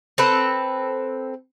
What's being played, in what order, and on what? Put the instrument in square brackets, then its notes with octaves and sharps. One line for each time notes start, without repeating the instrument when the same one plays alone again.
[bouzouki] C4 A4 B4